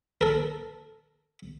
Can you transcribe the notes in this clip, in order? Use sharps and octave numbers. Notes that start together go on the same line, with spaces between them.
A4 A#4